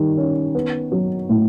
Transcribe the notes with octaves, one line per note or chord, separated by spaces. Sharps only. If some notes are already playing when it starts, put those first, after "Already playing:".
Already playing: D#3 G3
C#4
B3
F#3
A2